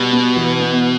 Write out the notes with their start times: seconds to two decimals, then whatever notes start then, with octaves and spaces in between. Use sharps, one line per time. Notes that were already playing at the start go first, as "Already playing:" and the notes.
Already playing: B2 G3
0.13 B3
0.37 E3
0.60 B3